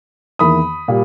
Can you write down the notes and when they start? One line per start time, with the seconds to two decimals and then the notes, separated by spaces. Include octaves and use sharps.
0.39 E2 D#3 A#3 E4 B5 D#6
0.88 A#2 G3